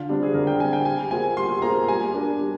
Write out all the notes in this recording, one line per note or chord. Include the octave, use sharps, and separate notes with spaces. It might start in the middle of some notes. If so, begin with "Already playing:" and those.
Already playing: D3 F4
G3 C4 D4
G#4
D3 A#4
G5
G3 C4 G#5
G5
G3 G#5
A#3 F4 G#4 C5 G#5
G3 C6
A#3 F4 G#4 C5 A#5
G3 G#5
D4 G4 A#4
G3